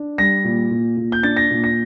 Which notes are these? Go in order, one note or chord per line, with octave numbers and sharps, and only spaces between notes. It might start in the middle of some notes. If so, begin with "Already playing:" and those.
Already playing: D4
G3 A#6
A#2
A#2
A#2
G6
D4 A6
A#6
A#2
A#6